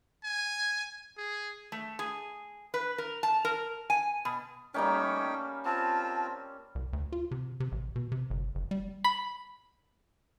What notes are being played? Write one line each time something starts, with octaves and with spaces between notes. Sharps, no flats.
G#5
G#4
A3
G#4
B4
A#4
A5
A#4
G#5
B2
G3 A3 A#3 C#4 D#4 G5
C4 F4 A5
C2
D2
F4
C3
C3
A1
B2
C3
G1
F#1
G3
B5